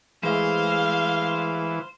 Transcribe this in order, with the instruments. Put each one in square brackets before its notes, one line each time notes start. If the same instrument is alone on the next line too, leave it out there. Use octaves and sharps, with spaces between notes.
[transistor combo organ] E3 [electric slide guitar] G#3 A3 [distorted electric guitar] C5 [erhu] F5